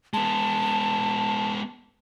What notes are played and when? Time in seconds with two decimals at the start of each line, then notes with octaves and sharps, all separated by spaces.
0.14 G#3 B3 A5